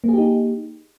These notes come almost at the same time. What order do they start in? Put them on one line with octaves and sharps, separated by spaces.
A#3 G#4 G4 D#4